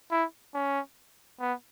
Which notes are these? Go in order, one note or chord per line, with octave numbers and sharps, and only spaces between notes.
E4
C#4
B3